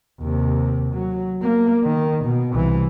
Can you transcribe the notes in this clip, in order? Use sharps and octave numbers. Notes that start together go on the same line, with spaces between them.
D#2 C3
F#3
A#3
D#3
B2
C2 E3